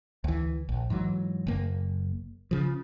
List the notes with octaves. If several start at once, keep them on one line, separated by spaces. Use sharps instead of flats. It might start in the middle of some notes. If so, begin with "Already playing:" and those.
D2 E3
A#1
G#2 E3 F#3
F#1 A#3
C#3 F3